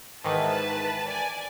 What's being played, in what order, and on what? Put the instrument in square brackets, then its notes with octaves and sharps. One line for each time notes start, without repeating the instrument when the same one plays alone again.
[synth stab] G#2 D#3 E3 [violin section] B4 A5
[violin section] D5 G#5